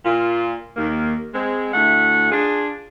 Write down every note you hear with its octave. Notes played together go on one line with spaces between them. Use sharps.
A#2 F4
D#2 A#3
G#3 C4
D2 A3 E4 F#5
D4 F4 G#4